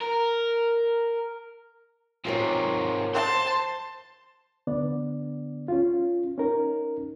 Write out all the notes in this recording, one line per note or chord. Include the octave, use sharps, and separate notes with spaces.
A#4
G#2 C3 F4 A#4 C#5
C5 A5 C6
D3 B3 D4 D5
C#4 F4
C#4 D#4 A#4